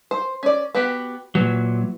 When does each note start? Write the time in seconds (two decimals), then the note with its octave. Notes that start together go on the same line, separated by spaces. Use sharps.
0.11 C5
0.43 C#4 D5
0.75 B3 F#4 G4
1.35 A#2 E3 F#3